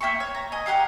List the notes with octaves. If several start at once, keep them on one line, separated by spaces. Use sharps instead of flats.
A#3 E5 G5 C#6
C#5
A#5
D#5 G#5
F4 G4 A#4 F#5